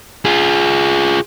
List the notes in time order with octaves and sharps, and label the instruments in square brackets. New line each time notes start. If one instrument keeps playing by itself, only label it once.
[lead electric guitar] F4 G#4